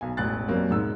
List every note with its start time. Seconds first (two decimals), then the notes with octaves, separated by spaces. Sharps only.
0.01 B1 G#5
0.17 E1 A1 F#6 A6
0.48 F#2 F#3 G3 A#3 C4
0.70 E1 G#2 E6